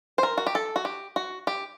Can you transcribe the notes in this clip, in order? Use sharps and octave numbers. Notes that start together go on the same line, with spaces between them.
C5
A#4
F#4
G4
A4
F#4
G4
F#4
G4